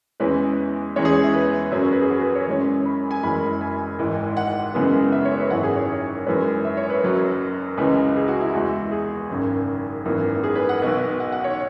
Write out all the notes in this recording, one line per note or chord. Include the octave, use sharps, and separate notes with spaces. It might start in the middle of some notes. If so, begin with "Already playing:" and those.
E2 E3 G#3 C#4 B4
E2 E3 G#3 C#4 C#5
G#4
E5
B4
F#2 F#3 C#4
B4
G#4
F#4
B4
C#5
F#2 E3 G#3 C#4
B5
G#5
F#1 F#2 E3 G#3 B5
G#5
G#1 G#2 E3
F#5
F#2 C#3 E3 G#3 B3
E5
C#5
B4
G#1 F#2 E3 C#4 F#5
G#4
C#5
F#2 E3 G#3 C#4 B4
E5
C#5
B4
F#1 F#2 F#3
C#2 C#3 E3 G#3 B4
G#4
F#4
E4
E2 E3 G#3 F#4
G#4
G#1 F#2 C#3
G#1 F#2 E3 B3
G#4
B4
F#5
B1 B2 B3
F#5
F#5
C#5